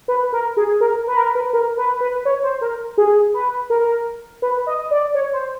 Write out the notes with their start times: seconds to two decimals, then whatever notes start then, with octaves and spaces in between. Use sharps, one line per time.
0.08 B4
0.32 A#4
0.57 G#4
0.81 A#4
1.07 B4
1.17 A#4
1.35 B4
1.53 A#4
1.77 B4
2.01 B4
2.25 C#5
2.43 C5
2.61 A#4
2.98 G#4
3.34 B4
3.70 A#4
4.42 B4
4.67 D#5
4.91 D5
5.14 C#5
5.33 C5